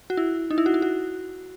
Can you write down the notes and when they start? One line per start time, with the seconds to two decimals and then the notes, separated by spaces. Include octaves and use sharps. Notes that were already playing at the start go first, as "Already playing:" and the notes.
0.10 F#4
0.17 E4
0.50 D#4
0.58 E4
0.66 F#4
0.74 E4
0.82 F#4